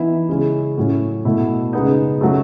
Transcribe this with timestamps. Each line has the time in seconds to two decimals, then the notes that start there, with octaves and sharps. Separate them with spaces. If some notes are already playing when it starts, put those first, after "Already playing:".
Already playing: E3 B3 D#4 E4 E5
0.29 C#3 G#3 C#4 E4
0.78 A2 F#3 C#4
1.25 B2 A3 E4
1.73 C#3 G#3 B3 D#4 D#5
2.21 C#3 F#3 A3